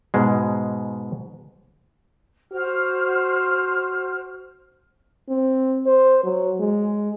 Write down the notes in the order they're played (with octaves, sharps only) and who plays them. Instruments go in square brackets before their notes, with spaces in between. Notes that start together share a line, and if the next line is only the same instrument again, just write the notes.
[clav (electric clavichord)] G#2 B2 G#3
[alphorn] F#4 [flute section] C5 F6
[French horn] C4
C5
F#3
G#3